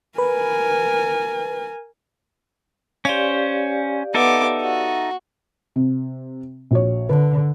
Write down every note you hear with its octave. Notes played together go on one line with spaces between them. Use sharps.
A#4 B4 G#5
C#4 G4 C5 D5 F5
B3 D#4 A4 E5 D6
F#4
C3
A#1 F#4 C#5
D3 B4